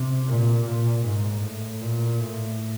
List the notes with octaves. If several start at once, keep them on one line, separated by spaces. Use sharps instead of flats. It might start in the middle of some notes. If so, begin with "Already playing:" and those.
Already playing: C3
A#2
A#2
G#2
A2
A#2
A2